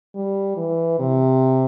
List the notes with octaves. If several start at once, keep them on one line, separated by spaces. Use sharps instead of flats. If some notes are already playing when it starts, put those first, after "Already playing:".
G3
E3
C3